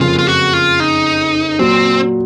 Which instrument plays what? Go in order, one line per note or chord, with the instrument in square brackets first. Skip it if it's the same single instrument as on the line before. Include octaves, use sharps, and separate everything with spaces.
[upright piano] F#1 F2 C#3 [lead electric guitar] F4
[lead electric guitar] F4
F#4
F4
D#4
[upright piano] A#2 F#3 [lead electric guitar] C4